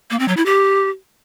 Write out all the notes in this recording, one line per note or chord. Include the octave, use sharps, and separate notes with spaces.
A#3
C4
F#3
E4
G4